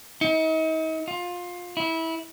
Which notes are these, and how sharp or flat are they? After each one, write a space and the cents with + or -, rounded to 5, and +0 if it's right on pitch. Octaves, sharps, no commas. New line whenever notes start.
D#4 +40
F4 +20
E4 -20